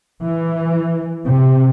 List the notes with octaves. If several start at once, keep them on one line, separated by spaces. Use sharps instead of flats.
E3
C3